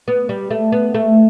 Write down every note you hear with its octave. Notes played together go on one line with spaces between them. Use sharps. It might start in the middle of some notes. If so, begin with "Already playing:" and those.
B3
G3
A3
B3
A3